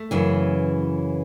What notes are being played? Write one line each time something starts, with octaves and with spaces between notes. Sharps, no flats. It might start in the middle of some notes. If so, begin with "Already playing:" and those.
Already playing: A3
F#2 C#3 E3